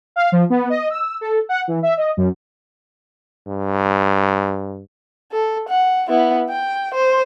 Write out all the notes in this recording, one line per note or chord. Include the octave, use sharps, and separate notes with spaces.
F5
F3
B3
D#5
E6
A4
F#5
E3
E5
D#5
F#2
G2
A4
F#5
B3 E4
G5
C5